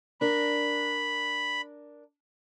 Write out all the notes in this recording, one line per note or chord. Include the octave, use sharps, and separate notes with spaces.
D4 A#4 B5